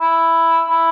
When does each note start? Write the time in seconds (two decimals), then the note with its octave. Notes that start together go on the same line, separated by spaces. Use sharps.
0.01 E4
0.70 E4